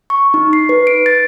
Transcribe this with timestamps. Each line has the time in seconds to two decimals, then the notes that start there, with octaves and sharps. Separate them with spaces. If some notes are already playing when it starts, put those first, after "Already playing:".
0.10 C#6
0.34 D#4
0.53 C7
0.69 B4
0.87 D7
1.06 A6